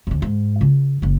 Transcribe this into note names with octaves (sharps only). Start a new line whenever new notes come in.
D#2 D3
G#2
C#3 F4
F#1 C#3